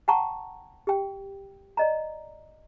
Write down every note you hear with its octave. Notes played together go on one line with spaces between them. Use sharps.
F#5 G5 A5 A#5 C#6
G4 G5
D5 D#5 A#5